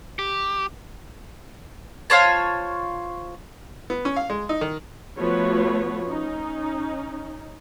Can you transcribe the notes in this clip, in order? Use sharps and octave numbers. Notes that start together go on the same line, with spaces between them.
G4
F4 C5 C#5 A5
B3
C#4
F5
G#3
D#4
D#3
F3 A3 B3 F#4 B4 C#5
C#4 D#4